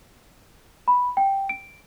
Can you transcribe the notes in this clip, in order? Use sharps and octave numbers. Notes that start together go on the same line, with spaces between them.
B5
G5
D7